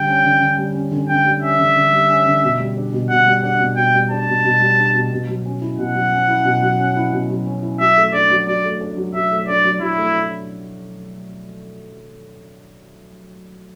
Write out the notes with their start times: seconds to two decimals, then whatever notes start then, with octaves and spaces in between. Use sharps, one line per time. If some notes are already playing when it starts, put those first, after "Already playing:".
Already playing: D3 G3 G5
0.08 C#4
0.24 D3
0.41 D3
0.58 G3
0.75 C#4
0.91 D3
1.09 D3 G5
1.26 G3
1.42 C#4 E5
1.59 D3
1.76 D3
1.92 G3
2.10 C#4
2.26 D3
2.44 B2
2.59 G3
2.77 D4
2.93 B2
3.10 B2 F#5
3.26 G3
3.43 D4 F#5
3.60 B2
3.77 B2 G5
3.94 G3
4.11 D4 A5
4.28 B2
4.45 B2
4.60 G3
4.78 D4
4.94 B2
5.12 B2
5.28 F#3
5.46 C#4
5.61 E4
5.78 B2 F#5
5.95 F#3
6.12 C#4
6.28 E4
6.45 B2
6.62 F#3
6.79 C#4
6.96 E4
7.12 B2
7.30 F#3
7.46 C#4
7.62 E4
7.80 F#3 E5
7.97 A3
8.13 D4 D5
8.30 F#3
8.47 F#3 D5
8.64 A3
8.81 D4
8.97 F#3
9.14 F#3 E5
9.31 A3
9.47 D4 D5
9.65 F#3
9.81 F#3 E4
9.97 A3
10.15 D4